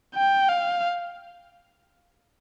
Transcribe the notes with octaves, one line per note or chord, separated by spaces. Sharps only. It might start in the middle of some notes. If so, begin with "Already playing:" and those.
G5
F5